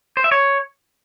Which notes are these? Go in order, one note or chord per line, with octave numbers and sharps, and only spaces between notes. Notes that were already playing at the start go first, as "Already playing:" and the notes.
C5
E5
C#5